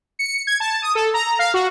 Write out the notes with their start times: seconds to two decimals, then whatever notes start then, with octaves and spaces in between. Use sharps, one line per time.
0.19 C#7
0.47 G#6
0.60 A5
0.82 D#6
0.95 A4
1.14 A#5
1.39 F5
1.54 F#4